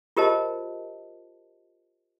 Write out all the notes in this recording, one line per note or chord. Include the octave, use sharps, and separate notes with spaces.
F4 G4 A#4 C5 D#5 A5